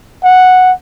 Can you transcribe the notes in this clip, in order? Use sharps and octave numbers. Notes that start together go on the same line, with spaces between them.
F#5